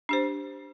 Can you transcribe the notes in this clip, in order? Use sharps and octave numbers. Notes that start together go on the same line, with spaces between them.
D4 G4 C5